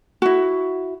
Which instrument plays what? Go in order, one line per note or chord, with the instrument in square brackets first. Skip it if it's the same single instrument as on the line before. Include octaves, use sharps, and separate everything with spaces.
[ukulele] E4 F#4